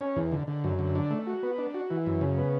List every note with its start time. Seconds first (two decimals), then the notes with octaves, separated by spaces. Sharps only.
0.01 C#4
0.16 E2
0.32 D3
0.47 D3
0.64 F#2
0.79 D3
0.95 D4
1.10 A3
1.27 F#4
1.43 B3
1.58 D4
1.74 F#4
1.90 E3
2.06 F#2
2.21 C#3
2.38 B3